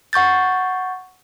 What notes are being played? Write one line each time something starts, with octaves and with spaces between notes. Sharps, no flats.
F#5 C#6 G6 A6